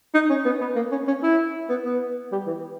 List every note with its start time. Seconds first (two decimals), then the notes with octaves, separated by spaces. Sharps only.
0.14 D#4
0.29 C#4
0.45 B3
0.61 B3
0.76 A#3
0.91 C#4
1.07 C#4
1.23 E4
1.70 B3
1.85 B3
2.32 G3
2.47 E3